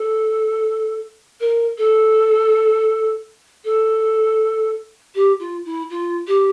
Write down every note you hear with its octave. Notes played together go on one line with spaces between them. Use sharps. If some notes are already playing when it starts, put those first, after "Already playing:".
Already playing: A4
A#4
A4
A4
G4
F4
E4
F4
G4